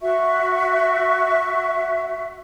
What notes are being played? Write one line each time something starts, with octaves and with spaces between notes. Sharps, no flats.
F#4 E5 C#6